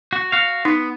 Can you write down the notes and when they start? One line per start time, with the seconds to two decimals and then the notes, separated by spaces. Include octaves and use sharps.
0.13 F#4
0.32 F#4 F5
0.65 B3 D#4